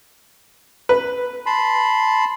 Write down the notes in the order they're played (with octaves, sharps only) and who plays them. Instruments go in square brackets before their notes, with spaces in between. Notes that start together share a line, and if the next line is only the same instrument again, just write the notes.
[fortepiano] B4
[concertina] A5 B5 C6